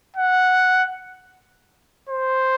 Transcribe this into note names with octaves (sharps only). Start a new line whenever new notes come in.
F#5
C5